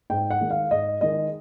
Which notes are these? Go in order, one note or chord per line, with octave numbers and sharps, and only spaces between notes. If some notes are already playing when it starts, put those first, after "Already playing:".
G#2 G5
F#5
D#3 G#3
F5
G#2 D#5
D#3 G#3 D#5